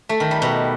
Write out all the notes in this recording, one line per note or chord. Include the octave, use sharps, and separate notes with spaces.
A3
D#3
G3
B2